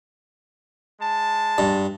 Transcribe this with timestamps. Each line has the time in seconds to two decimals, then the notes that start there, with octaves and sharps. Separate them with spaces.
1.01 G#3 A5
1.58 G2